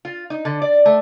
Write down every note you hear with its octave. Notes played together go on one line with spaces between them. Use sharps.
F4
D#4
D3
D5
A3